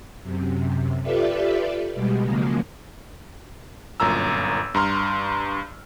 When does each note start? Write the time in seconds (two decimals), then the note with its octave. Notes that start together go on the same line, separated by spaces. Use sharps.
0.23 F#2 C3
1.02 F4 G4 A4 B4 D5 E5
1.94 B2 G3 G#3
2.24 C#3 F3 F#3 G#3 A#3
4.00 G1 F#2 A#2 A#5 E6
4.74 G2 A#5 C6 F6